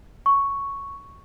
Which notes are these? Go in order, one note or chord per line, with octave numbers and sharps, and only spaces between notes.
C#6